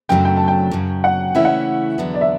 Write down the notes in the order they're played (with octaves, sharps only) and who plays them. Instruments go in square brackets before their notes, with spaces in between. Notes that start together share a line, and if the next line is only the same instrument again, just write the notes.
[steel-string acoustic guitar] F#2 C#3 F#3 A3 D4 [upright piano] G5
[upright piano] G5
A5
G5
[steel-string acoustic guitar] F#2 C#3 F#3
[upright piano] F#5
[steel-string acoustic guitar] C#3 E3 A3 C#4 E4 [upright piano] E5
[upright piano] F#5
[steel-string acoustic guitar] E2 D3 F#3 B3 D4
[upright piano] D5
E5